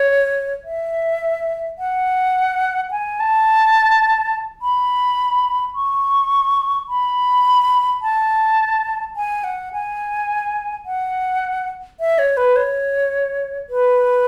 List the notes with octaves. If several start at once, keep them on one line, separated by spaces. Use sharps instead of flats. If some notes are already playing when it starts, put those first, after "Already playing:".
Already playing: C#5
E5
F#5
G#5
A5
B5
C#6
B5
A5
G#5
F#5
G#5
F#5
E5
C#5
B4
C#5
B4